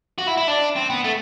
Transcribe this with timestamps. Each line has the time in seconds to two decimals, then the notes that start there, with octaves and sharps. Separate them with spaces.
0.18 F#4
0.27 E4
0.37 E4
0.47 D4
0.76 C4
0.90 B3
1.04 A3